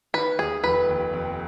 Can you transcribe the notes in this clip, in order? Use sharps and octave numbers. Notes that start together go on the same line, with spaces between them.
D#3 B4
D#2 G#4
F1 B4
D#2
F2